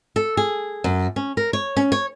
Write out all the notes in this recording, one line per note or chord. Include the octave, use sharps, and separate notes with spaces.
A4
G#4
F#2
C#4
A#4
C#5
C#4
C#5